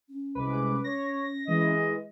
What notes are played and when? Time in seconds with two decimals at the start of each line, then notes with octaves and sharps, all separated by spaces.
0.09 C#4
0.35 C2 G#3 B4 D6
0.84 C#5 A#6
1.47 E3 G#3 D#5